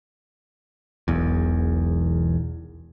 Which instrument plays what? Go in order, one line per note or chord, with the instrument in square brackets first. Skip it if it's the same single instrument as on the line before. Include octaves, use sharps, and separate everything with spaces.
[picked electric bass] E1 B1 E2